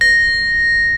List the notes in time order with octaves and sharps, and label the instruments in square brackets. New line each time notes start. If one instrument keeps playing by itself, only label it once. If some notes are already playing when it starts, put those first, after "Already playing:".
[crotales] A#6